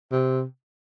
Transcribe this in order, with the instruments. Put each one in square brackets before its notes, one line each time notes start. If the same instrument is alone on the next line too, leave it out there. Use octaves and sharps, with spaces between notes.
[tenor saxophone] C3